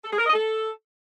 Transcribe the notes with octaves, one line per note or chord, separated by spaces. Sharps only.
A4
G#4
A#4
D#5
A4